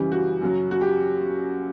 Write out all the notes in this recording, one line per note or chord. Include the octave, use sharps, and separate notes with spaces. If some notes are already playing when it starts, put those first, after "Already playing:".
Already playing: F#2 C#3 E3 G3 G4
F#4
F#2 C#3 F#3
F#4
G4